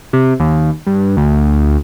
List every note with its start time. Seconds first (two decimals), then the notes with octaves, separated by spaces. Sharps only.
0.13 C3
0.40 D#2
0.87 G2
1.17 D2